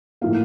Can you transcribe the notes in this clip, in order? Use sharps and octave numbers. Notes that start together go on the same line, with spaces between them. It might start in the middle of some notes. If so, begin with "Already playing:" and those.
A2 F3 A#3 F5